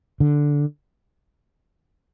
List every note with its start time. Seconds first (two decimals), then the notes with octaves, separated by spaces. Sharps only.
0.20 D3